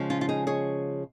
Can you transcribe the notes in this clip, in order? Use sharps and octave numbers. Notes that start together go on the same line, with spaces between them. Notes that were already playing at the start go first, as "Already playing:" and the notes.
Already playing: C#3 F3 G#3
C#4 F4
F4
D#4 G#4
G#4 C#5